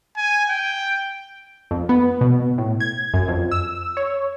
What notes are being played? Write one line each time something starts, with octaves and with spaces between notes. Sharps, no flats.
G#5
G5
F2
B3
B2
A2
G#6
F#2
F2
E6
C#5